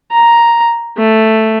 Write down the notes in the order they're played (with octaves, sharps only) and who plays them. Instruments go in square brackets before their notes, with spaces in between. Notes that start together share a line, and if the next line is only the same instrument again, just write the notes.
[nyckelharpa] A#5
A3